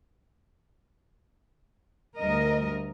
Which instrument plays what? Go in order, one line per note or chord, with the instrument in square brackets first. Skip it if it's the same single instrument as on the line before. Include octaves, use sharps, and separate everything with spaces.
[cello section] D2 G3 A#4 D#5